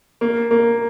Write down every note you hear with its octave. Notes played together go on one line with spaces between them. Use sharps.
A#3
A#3